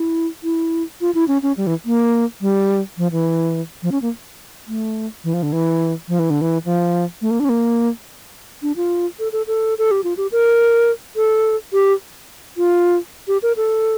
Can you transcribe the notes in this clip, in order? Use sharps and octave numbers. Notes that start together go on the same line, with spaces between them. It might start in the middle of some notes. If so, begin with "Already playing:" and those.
Already playing: E4
E4
F4
E4
C#4
C#4
G3
E3
A#3
G3
F3
E3
F3
C#4
A#3
A3
E3
F3
D3
E3
F3
E3
D3
E3
F3
A3
A#3
D4
C#4
A#3
D4
F4
A4
A4
A4
A4
G4
F4
G4
A#4
A4
G4
F4
G4
A#4
A4